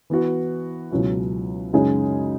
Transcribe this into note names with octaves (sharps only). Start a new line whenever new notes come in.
E3 B3 F#4
C#2 B2 F#3 C#4 E4
F#2 C#3 G#3 D#4 G#4